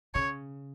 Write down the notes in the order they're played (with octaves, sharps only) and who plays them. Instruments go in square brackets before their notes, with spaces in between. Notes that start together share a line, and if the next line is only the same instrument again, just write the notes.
[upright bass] C#3 [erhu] C#5